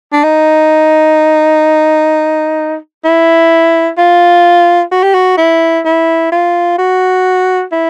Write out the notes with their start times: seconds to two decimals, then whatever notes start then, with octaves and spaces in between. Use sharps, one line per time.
0.13 D4
0.24 D#4
3.04 E4
3.98 F4
4.92 F#4
5.03 G4
5.15 F#4
5.38 E4
5.85 E4
6.32 F4
6.79 F#4
7.72 E4